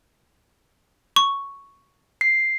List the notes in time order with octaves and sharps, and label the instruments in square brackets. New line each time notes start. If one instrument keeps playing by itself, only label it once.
[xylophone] C#6
[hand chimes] C7